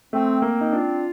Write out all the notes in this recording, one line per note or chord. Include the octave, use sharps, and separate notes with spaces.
A3 C4
A#3 C4
D#4
D4 F4